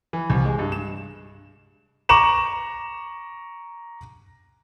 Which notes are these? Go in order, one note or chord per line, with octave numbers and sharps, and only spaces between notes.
E3
C2
G#3
G2
E7
A#5 C#6 D6 E7 F#7